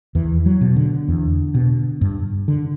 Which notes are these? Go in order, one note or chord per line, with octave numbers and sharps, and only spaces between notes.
E2 E3
F#3
B2
D3
E2
B2
G2
D3